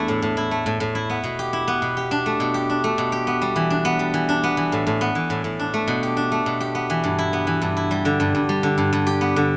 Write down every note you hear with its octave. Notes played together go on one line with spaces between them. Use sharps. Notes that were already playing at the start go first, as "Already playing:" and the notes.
Already playing: E2 A3 B3 D4 E4
A2
A2
E4
A3
A2
A2
E4
B3
B2
G4
E4
B3
B2
G4
D4
A3
B2
G4
D4
A3
B2
G4
B3
G3
E3
D4
B3
G3
E3
D4
B3
E3
A2
A2
B3
E3
A2
A2
D4
A3
B2
G4
D4
A3
B2
G4
B3
E3
G2
E4
B3
E3
G2
E4
G3
D3
G2
G2
G3
D3
G2
G2
G4
B3
D3